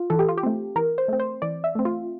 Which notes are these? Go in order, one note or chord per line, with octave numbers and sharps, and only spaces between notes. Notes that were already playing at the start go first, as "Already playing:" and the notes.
Already playing: F4
E3 A4
G4
F4
G4
A3 C4
E3 A#4
C5
A3 C4
C5
E3 D5
E5
A3 C4
F4